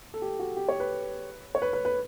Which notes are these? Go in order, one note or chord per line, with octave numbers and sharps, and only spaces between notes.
A4
G4
F#4
G4
C#5
B4
C#5
B4
B4
B4